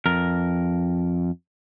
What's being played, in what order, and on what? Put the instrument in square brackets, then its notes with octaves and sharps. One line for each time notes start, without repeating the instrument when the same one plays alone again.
[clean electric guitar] F2 A#4